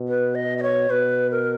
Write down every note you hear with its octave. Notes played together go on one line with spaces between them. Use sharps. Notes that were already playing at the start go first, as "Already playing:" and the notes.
Already playing: B2
B4
D#5
D#5
C#5
B2 B4
A#4